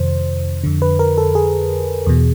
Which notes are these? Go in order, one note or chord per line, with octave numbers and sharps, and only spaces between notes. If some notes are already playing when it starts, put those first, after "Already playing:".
Already playing: F2 C3 D#3 C5
F2 D3
B4
A#4
A4
G#4
E2 B2